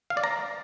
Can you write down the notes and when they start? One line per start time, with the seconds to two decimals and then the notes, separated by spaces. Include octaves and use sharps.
0.10 F5
0.17 D5
0.24 A#5